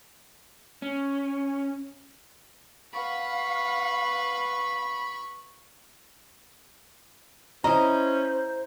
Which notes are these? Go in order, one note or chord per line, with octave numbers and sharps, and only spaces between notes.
C#4
B4 F5 F#5 B5 C#6
C#4 E4 C5 D#5 A#5